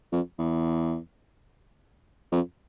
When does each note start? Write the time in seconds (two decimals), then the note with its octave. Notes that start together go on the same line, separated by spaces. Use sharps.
0.12 F2
0.39 E2
2.32 F2